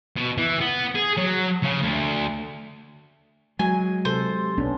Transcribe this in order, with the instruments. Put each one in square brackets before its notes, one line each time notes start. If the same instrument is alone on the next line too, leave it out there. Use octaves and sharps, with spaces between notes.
[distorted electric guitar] B2
E3
B3
G#4
F#3
C#3
D2
[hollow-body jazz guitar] F#3 [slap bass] G#3 [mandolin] G#5
[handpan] C3 A4 [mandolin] C5
[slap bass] B1 [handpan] B3 C#4 D4